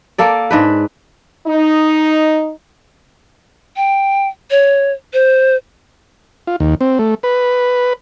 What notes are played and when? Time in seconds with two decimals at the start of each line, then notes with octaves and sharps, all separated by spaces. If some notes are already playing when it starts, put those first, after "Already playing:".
0.18 A#3 A4 D5
0.51 G#2 D4 B4
1.47 D#4
3.76 G5
4.51 C#5
5.13 C5
6.47 F4
6.60 D#2
6.81 C4
6.99 A3
7.23 B4